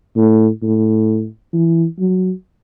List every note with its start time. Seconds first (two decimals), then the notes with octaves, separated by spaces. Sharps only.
0.16 A2
0.62 A2
1.53 E3
1.99 F#3